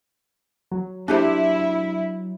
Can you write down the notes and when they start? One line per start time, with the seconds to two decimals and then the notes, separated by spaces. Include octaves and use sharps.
0.71 F#3
1.08 D4 E4 G4 C5